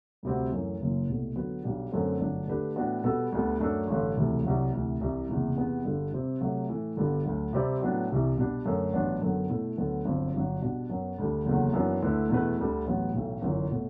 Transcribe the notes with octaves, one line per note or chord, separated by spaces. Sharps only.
D2 C3 G3 C4 F#4
F#2 E3 A3
F#1 F#2 E3
C2 B2 A3
D3 F#3 B3 F#4 B4
B1 B2 G3 D4 G4
F#2 D3 A3 C4
G1 G2 F#3 A3 D4
D3 A3 D4 G4 B4
A2 E3 B3 D4 F#4
B2 G3 B3 F#4 A4
D2 D3 G3 B3
F#2 F#3 A3 D4 A4
A1 G2 D3
E1 D2 C3 E3 A3
C2 C3 F#3
D2 C3 E3
C2 C3 E3
F#1 E2 C3 G3
E2 C3 E3 B3
G1 G2 D3 G3
C3 G3 C4 G4
C3 F#3 A3
A2 E3 A3
G1 G2 D3 G3 B3
D2 D3 F#3
C3 G3 C4 G4 D5
A2 F#3 B3 D4 F#4
C2 C3 E3
B2 G3 D4 G4
F#2 D3 A3
A1 G2 F#3 B3 D4
F#2 D3 F#3 B3
B2 A3 E4
D2 D3 F#3 B3
G1 G2 F#3 C4
G1 G2 F#3
B2 G3 D4 F#4
F#2 F#3 B3
D2 D3 G3
F#1 E2 D3 F#3
F#2 E3 B3 D4 F#4
D2 D3 A3 E4 B4
E2 B2 A3 E4 B4
D2 D3 G3
A1 A2 F#3 B3
B1 A2 E3 A3
G1 F#2 E3
B2 A3